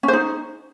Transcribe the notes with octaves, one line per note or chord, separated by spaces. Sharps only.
C#4
C5
D#4